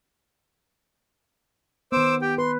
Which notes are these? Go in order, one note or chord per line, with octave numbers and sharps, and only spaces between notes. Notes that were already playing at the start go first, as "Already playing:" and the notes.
D#3 B3 C5 D6 E6
G4 G5
B4 C6